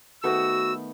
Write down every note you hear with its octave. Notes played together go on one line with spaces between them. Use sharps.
D#3 A3 B3 F#4 E6